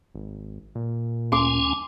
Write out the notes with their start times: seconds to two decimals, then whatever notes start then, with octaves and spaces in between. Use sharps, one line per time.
0.15 G#1
0.75 A#2
1.32 D2 C#4 G#5 C6 D6